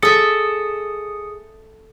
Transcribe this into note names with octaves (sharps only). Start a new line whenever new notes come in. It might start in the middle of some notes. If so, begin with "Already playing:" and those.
G#4 A4 E5 D#6 C#7